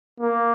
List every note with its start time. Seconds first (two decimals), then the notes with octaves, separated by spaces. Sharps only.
0.20 A#3